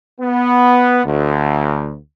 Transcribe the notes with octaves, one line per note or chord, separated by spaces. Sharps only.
B3
D2